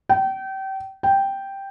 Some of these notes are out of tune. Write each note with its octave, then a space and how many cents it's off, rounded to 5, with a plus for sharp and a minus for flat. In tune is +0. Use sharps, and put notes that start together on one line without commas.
G5 -30
G5 +0